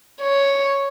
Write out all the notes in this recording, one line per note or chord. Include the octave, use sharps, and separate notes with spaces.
C#5